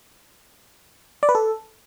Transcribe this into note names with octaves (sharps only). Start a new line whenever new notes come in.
D5
B4
A4